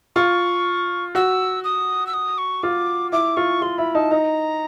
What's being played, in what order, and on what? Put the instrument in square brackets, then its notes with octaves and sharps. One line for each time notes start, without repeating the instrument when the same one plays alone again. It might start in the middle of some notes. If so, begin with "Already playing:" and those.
[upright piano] F4 [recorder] C#6
[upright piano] F#4 [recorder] E6
[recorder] D#6
E6
D#6
C#6
[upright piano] F4 [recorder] D6
[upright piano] E4 [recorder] D6
[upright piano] F4 [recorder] C#6
[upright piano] F4 [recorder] C6
[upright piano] E4 [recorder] B5
[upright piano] D#4 [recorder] A5
[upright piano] D#4 [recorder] A#5